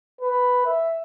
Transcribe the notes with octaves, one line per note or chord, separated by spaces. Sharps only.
B4
E5